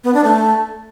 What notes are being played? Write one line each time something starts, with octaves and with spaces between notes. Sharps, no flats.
B3
D4
A3